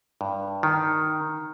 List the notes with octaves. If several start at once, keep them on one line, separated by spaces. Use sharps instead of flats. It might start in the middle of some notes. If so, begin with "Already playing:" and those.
G2
D#3